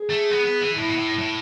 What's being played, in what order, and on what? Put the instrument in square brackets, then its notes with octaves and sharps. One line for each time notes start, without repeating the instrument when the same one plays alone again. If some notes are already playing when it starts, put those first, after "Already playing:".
Already playing: [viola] G#4
[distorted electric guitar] A3
B3
B3
E3
[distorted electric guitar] A2 [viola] E4
[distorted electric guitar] B2
A2
A2